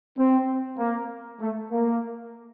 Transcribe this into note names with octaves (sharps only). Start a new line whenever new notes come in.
C4
A#3
A3
A#3